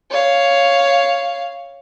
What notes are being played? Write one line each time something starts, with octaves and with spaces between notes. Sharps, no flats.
C#5 F5